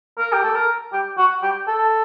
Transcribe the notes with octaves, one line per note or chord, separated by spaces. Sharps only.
A#4
G4
A4
A#4
G4
F#4
G4
A4